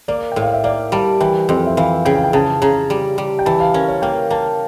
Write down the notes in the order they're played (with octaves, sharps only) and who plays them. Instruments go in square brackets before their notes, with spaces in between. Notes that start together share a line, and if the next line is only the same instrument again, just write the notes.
[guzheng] A#3 [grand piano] D5
[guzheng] A2 [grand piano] G5
[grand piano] F5
E5
[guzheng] A#3 [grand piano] D5
[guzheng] G3 [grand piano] A5
[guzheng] E3 [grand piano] G5
[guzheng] F2 [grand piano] G5
[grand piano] E5
[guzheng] E3 [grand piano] F5
[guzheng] C#3 [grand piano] G5
[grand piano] F5
G5
[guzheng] C#3 [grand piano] A5
[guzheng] C#3 [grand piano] A#5
[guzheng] G3
G3
[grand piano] G5
[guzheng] E3 [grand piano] A5
[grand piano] F5
[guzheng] C#4 [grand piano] A#4
[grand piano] C#5
[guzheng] A#3 [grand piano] G5
[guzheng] A#3 [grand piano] A5